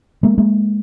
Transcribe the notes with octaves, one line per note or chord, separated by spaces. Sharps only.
G#3 A#3
G#3 A#3